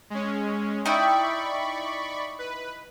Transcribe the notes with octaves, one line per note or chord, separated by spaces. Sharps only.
G#3 C#4
D#4 E4 D5 G5 B5 C#6
B4